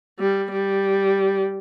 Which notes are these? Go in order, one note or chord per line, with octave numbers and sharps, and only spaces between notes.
G3
G3